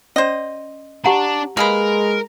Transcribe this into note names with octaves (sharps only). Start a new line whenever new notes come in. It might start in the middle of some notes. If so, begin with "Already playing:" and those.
C#4 C5 D5 D#5
D4 G4 F#5 A#5
G#3 A#3 G#4 A#4 B4